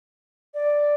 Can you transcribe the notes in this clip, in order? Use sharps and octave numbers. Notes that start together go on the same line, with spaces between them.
D5